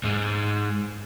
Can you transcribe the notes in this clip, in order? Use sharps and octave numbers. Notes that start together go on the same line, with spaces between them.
G#2 G#3